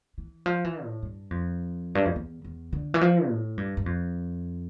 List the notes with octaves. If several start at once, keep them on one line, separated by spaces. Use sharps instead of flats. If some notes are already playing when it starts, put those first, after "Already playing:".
E3
F3
E3
A2
G2
F2
G2
F2
E2
E2
D3
E3
F3
A2
G2
G2
F2